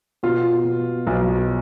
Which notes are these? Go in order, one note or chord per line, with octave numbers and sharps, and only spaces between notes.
B2 F4
B2
B1